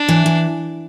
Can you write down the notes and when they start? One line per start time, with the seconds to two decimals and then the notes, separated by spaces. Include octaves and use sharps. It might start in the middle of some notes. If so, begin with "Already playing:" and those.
Already playing: D4
0.09 E3
0.26 E3